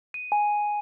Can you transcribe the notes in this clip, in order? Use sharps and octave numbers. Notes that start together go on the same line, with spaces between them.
D#7
G#5